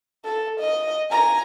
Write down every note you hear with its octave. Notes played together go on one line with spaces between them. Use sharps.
A4
D#5
G#5 A#5